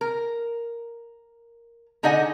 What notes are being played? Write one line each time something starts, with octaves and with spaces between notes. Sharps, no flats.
A#4
D3 D#4 G#4 D#5 F#5 G#5